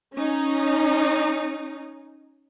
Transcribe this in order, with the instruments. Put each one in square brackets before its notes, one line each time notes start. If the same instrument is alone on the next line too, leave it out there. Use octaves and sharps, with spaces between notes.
[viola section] C#4 D#4